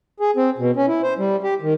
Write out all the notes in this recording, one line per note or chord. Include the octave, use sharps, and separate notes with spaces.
G#4
C4
B2
C#4
E4
C5
G3
G4
D#3